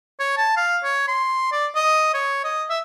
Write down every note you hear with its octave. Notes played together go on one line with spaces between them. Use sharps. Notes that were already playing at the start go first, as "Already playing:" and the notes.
C#5
A5
F5
C#5
C6
D5
D#5
C#5
D#5
E5